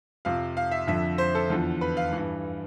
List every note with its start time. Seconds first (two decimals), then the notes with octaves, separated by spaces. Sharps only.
0.25 F2 C3 F3 F5
0.57 F5
0.71 E5
0.87 F2 D3 F3 E5
1.18 C5
1.35 A4
1.50 E2 D3 F3
1.81 B4
1.97 F5
2.13 G2 E3